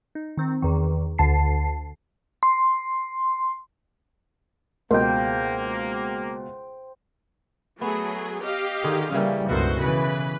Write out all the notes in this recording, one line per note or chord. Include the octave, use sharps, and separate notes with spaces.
D#4
D#3 C4
E2 D#3
D2 D3 A5 C7
C6
C#2 B2 A#3 A#4 C5 D#5 G5
F#3 A3 B3 G#4
G4 D#5 F5
D3 D#3 G#4
C#3 E3 G3 A#3 C#4
C#2 G2 B2 F#4 A4 A#4 C5
C#3 E3 B4 B5